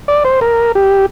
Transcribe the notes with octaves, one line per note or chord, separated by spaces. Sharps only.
D5
C5
A#4
G4